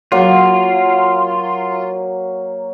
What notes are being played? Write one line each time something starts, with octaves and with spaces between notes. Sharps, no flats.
F#3 A#3 F4